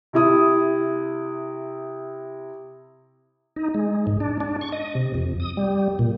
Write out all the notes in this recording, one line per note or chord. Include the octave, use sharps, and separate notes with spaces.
C3 E4 D#6
D#4
G#3
G#2
D4
D4
C#6
D#5
C3
F2
D#6
G3
A#2